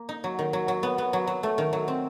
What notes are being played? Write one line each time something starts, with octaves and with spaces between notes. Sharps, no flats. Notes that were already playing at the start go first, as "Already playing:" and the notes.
Already playing: A#3
D#4
F#3
D#3
F#3
F#3
B3
B3
F#3
F#3
A3
D#3
F#3
C4